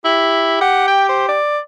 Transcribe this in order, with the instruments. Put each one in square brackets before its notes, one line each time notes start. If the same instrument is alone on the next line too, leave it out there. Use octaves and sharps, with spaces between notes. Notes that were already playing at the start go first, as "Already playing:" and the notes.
[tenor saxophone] E4 [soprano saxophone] G4
[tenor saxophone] G4 [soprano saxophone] F#5
[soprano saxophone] G5
C5
D5